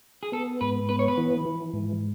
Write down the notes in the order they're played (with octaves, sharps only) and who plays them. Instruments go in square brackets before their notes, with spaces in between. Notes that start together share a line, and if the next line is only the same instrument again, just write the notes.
[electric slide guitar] G#4
[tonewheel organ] B3 [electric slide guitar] A4
[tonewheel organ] G#2 [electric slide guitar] B4
[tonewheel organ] B3 [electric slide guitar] B4
[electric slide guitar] C#5
B4
[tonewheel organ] E3
E3
G#2